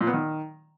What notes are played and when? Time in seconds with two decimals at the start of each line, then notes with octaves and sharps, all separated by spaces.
0.01 A#2
0.07 B3
0.13 D#3